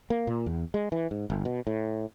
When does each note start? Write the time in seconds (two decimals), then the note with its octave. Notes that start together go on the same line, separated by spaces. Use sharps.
0.10 A#3
0.27 A#2
0.46 E2
0.74 G#3
0.92 E3
1.11 G#2
1.30 G1
1.45 B2
1.67 A2